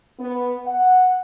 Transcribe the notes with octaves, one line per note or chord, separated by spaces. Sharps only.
B3
F#5